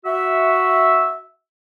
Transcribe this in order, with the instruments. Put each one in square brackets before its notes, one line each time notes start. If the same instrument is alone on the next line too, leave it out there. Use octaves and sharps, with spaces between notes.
[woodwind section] F#4 E5